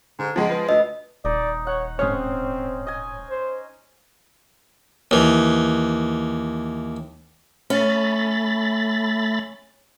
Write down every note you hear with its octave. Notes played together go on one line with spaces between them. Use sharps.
G#2 D3
C#2 F3 G#3
F4 B4
D2 D#5
D#1 D#4 D5
C#5 F#5
G#2 C4 C#4 C5 C#5 D#6
D#5 G#5
C5
D#2 E3
A3 C#4 B5 A6